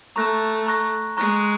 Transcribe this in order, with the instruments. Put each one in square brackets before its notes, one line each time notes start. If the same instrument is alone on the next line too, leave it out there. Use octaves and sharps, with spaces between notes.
[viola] A3 [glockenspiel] A#5 C#6 F#6 A#6
[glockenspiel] A#5 C#6 F#6 A#6
[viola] G#3 [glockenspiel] A#5 C#6 F#6 A#6